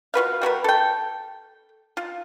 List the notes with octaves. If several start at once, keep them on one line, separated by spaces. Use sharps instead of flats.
F4 F#4 B4 F5
G3 F#4 A#4 B4
A4 G5
F4